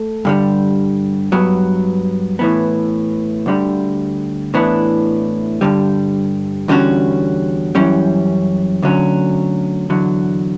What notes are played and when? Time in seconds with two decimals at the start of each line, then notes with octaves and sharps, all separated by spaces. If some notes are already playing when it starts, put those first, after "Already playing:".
Already playing: A3
0.25 G2 D3 G3
1.32 G2 F#3 B3
2.39 A2 E3 B3
3.46 D2 D3 G3
4.54 A2 E3 B3 D4
5.61 G2 D3 G3
6.68 E2 D3 G3 C#4 F#4
7.75 F#2 E3 G3 C#4
8.83 D2 D3 F#3 C#4
9.90 E2 D3 F#3